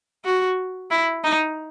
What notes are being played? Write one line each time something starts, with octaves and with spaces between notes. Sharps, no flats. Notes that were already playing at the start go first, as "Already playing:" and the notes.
F#4
E4
D#4